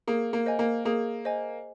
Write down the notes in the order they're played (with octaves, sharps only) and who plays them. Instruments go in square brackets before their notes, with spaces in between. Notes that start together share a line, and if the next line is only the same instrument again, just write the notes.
[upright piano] A#3 [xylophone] G#4
[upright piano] A#3
[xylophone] C5 D#5 G#5
[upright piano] A#3
[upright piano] A#3 [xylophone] G#4
[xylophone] C5 D#5 G#5